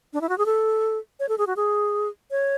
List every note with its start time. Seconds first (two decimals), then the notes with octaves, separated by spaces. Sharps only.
0.13 D4
0.21 E4
0.29 F#4
0.38 G#4
0.46 A4
1.20 C#5
1.29 A4
1.38 G#4
1.47 F#4
1.56 G#4
2.31 C#5